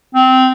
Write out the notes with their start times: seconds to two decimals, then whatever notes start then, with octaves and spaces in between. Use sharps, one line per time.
0.15 C4